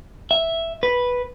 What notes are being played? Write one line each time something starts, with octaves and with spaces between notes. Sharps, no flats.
E5
B4